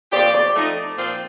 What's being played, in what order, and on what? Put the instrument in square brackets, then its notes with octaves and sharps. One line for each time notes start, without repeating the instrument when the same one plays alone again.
[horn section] A#2 F3 C4 G4 [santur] D5
[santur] D5
[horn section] F3 A3 C4 D#4
A#2 F3 C4 F4